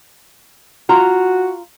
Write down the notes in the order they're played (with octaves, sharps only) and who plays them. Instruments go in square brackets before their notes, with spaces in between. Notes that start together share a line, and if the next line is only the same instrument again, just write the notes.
[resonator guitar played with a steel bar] F4 A#5 [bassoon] F#4